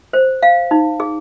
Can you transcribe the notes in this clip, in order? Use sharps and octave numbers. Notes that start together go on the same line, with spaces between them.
C5
F5
D#4
G#4